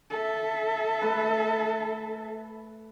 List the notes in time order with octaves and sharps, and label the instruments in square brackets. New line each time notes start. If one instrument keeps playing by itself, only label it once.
[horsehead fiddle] A4 E5
[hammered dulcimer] A3 B4